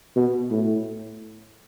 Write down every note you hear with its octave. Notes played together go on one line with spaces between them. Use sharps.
B2
A2